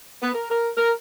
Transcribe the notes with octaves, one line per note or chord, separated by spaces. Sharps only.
B3
A#4
A#4
A#4